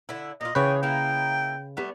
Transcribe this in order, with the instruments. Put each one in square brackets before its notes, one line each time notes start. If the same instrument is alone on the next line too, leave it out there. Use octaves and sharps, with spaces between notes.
[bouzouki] D3 E4
[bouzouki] A#2 F4 [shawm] D#5
[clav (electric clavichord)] C#3 B4 [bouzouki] E3 G#4 C#5 [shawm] G5
[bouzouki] A#3 D#4 E4 [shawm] G5
[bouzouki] G3 A3 B3